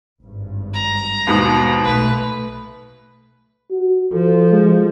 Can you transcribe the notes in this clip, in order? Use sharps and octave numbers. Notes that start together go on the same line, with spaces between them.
G#1 G2
A#5
D#2 G#2 B2
B1 B2 A3 B4
F#4
F3 A4
G#3